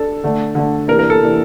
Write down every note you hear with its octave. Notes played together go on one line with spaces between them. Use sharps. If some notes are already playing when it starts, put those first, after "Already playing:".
Already playing: D4 A4
D3 A3 D4
D3 A3 D4
C3 E3 A#3 D4 A#4
A#4
A4
C3 E3 A#3 D4